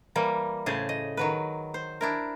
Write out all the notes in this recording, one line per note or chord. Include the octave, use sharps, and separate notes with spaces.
E3 G3 A#3
A2 C#3 G#4 C5 A5
D#5
D#3 F#3 B4
C5
D4 E4 A#4